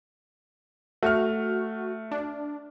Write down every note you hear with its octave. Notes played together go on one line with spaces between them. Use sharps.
A3 F#4 F6
D4